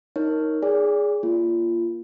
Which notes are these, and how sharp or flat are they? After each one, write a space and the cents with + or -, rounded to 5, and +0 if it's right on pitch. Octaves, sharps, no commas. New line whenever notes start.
D#4 +10 A#4 +0 C#5 +0
G#4 +0 D5 -30 G#5 -40
A#3 +15 F4 -25